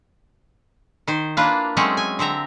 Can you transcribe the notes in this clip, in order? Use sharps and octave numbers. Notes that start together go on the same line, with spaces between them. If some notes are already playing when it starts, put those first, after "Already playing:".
D#3 C5
A#3 D4 E4 F4 B4
F#3 G#3 A3 C4 C#4
G#5
D3 C4 E5 A#5